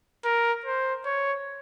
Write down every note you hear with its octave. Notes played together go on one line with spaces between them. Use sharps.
A#4
C5
C#5